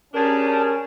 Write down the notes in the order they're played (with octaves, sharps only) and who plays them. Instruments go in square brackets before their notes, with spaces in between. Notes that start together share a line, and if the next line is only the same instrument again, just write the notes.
[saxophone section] G3 D4 G#4 [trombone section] C#4 [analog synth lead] A#4 [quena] A5